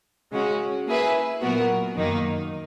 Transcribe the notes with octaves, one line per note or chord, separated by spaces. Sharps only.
C#3 G#3 C#4 F#4
A#3 E4 G#4 B4 E5
A#2 F#3 B3 F#4 A#4
F#2 D#3 A#3 D#4